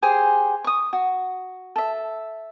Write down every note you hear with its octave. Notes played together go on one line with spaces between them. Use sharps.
G4 G#4 C5 G#5
C#6 D#6
F#4
A4 E5